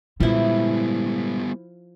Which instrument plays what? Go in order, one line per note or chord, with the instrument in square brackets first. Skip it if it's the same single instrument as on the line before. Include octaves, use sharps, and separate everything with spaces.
[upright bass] A#2 G#3 [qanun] F3 E4 [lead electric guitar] G3 B3